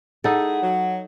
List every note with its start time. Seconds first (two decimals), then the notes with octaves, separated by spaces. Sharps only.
0.24 G#3 D#4 E4 G#4 A4 F#5
0.63 F#3